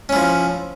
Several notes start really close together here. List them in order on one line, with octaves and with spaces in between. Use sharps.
C#4 E4 F3